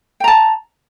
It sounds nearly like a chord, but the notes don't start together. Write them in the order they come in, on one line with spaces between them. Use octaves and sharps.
G5 A#5 A5